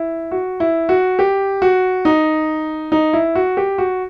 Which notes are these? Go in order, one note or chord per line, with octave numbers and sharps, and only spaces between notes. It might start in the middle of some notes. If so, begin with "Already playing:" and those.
Already playing: E4
F#4
E4
F#4
G4
F#4
D#4
D#4
E4
F#4
G4
F#4